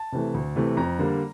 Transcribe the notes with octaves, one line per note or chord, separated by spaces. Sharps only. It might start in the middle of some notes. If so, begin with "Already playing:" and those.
Already playing: A5
C3 E3 A3
D2
C3 E3 A3
F2 A#5
D3 G3 A#3